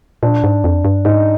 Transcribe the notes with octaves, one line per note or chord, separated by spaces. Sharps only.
A#2 D4
G#2
F2
G2
G#2 D#4